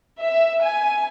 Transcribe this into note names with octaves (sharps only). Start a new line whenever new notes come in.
E5
G#5